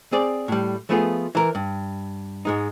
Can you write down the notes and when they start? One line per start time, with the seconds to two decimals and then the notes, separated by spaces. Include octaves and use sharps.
0.12 C4 G#4 D5
0.48 A2 G3
0.89 F3 A3 B3 F4 G#4
1.35 E3 A#4
1.55 G2
2.45 G#2 G#3 D#4